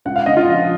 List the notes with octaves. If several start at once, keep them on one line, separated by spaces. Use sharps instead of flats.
C#2 F#5
F5
C#3 D#5
F4 F5
F3